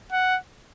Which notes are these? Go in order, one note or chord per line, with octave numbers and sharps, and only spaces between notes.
F#5